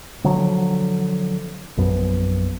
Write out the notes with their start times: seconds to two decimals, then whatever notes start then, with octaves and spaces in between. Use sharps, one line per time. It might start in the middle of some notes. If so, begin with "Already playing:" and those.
0.24 D3 F3 F#3
1.77 A#1 F#2 B3